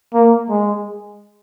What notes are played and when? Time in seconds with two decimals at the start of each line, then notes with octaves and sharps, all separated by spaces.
0.14 A#3
0.50 G#3